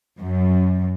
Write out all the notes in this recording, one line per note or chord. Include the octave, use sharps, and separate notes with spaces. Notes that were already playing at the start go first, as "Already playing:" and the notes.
F#2